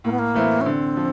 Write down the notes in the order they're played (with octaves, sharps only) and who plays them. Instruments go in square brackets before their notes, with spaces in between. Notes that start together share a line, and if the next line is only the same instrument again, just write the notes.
[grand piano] A2 [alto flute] A#3
[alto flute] B3
A#3
[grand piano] E3 A3 C4 E4
[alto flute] C#4
[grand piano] D3 [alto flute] C4
[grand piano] F3